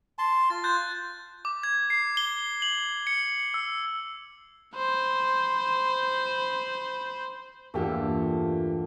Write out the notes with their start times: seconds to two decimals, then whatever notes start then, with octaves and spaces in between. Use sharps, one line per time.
0.18 A5 C6
0.50 F4 A6
0.64 F#6 G6 A6
1.45 D6
1.63 G#6
1.90 C7
2.17 G7
2.62 F#7
3.07 C#7
3.54 E6
4.75 C5 B5
7.74 E2 G2 A#2 D3 A3 A#3 F4 G4